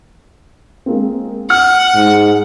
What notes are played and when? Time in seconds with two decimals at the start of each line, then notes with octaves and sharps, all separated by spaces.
0.86 G#3 A#3 C4
1.50 F#5 F6
1.95 G#2